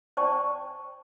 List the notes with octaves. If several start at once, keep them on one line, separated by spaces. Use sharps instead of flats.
C5 D5 G5 A5 C#6